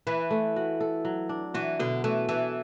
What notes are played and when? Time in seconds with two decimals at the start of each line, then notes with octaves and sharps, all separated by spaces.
0.07 E3 B4
0.31 A3
0.56 F#4
0.81 A4
1.05 F#3
1.29 D4
1.54 E3 F#4
1.79 B2 D3
2.04 E3 A3
2.29 E3 A4